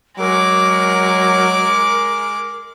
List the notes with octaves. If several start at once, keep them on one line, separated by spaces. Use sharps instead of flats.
F#3 G#3 A#4 D6